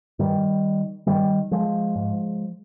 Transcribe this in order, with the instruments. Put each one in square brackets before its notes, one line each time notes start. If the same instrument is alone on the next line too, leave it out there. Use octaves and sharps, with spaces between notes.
[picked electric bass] G2 D#3 G3
G2 D#3 G3
F3 G#3
G#2